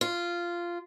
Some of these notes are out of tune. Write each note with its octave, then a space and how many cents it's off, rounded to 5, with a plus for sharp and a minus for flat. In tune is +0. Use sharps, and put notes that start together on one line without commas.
F4 -10